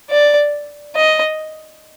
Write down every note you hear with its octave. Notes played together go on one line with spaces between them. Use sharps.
D5
D#5